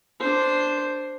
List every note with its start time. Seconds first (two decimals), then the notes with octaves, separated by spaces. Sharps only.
0.19 D4 C5